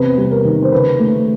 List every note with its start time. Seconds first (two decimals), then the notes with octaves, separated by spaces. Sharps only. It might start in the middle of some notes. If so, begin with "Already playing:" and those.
Already playing: E2 C3 B4
0.18 G3
0.31 A#4
0.45 D#3
0.63 C5
0.72 C#3 B4
0.99 A3